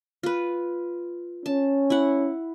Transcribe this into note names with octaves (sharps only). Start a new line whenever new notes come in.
F4 B4
C#4 A5
E4 F#5